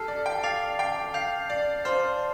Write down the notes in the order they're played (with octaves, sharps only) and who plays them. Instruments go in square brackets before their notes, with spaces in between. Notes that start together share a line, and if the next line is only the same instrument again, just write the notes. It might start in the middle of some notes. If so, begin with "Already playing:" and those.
Already playing: [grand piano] G4 A4 [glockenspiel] A5 F6 C7
[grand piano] D5
G5
[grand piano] F5 [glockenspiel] D6 A6 C7 F7
[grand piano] G5
[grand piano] F5 [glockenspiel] G6 C7 F7
[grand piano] D5
[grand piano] C5 [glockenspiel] A5 C6 F6